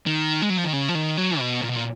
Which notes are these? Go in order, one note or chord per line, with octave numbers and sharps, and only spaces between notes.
D#3
G#3
F#3
F3
D#3
C#3
F3
D#3
F#3
B2
A#2
B2
A#2